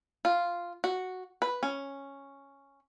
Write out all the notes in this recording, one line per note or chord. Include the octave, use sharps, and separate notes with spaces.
F4
F#4
B4
C#4